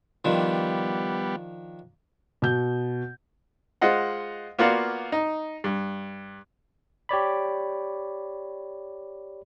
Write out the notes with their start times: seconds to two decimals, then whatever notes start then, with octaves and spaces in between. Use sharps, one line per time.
0.25 D#3 F3 G3 B3 D4
2.42 B2 G6
3.81 G#3 F4 C5 D#5 F5 F#5
4.59 A#3 B3 F4 F#4 D5 F#5
5.12 D#4
5.64 G2
7.09 G4 C#5 D5 B5